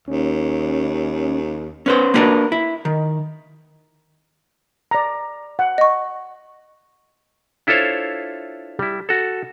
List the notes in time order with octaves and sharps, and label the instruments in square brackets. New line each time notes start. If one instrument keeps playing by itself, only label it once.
[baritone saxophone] D#2 [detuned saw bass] C#4
[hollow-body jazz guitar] C#4 B4 C5
A#3 B3 D4 F#4 A#4 B4
E4
D#3
[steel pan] D5 A#5
F#5
[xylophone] D#5 C#6
[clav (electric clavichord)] D4 E4 F4 A4 C5 C#5
G3 E4
F#4 A4